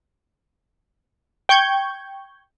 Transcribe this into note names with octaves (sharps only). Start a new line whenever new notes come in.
G5 C#6 G6 G#6